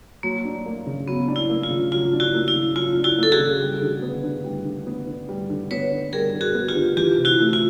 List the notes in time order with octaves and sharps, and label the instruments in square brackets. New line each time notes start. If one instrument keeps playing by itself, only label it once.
[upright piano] F#3 [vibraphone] A#3
[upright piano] D4
A#3
C#3
[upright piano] F#3 [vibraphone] B3
[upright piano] D4
[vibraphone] E4
[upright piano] A#3
[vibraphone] F4
[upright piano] C#3
[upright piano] F#3 [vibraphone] F4
[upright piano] D4
[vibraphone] E4 F#4
[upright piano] A#3
[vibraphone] E4
[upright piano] C#3
[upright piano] F#3 [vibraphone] F4
[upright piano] D4
[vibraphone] E4 F#4
[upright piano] A#3 [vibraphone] A4
[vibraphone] F#4 G#4
[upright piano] C#3
G3
D3
B3
D3
G3
D3
B3
D3
G3
D3
[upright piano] B3 [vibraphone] B4 C#5
[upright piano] D3
[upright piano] G3 [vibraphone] G#4 A#4
[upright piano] D3
[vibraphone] F#4 G#4
[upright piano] B3
[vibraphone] F4 G4
[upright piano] D3
[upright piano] E3 [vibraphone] F4 G4
[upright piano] C3
[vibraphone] E4 F#4
[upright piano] A3
[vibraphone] F4